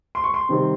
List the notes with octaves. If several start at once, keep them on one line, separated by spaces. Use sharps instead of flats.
C6
C#6
C6
C3 D#3 G3 C4